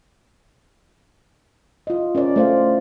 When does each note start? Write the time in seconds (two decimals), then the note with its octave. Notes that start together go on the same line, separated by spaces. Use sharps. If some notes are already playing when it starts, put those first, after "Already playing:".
1.87 F4 D#5
2.15 C#4 A#4 C5 D5
2.36 A3 C5 F5